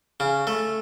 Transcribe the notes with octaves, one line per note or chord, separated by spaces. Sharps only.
C#3
A3